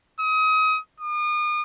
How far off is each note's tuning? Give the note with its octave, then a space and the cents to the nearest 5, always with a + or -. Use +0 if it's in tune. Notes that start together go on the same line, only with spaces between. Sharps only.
D#6 +30
D#6 -40